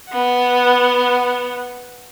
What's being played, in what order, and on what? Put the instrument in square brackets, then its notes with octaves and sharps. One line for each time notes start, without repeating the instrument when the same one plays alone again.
[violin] B3 F#5